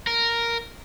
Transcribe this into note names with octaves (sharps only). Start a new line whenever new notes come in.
A#4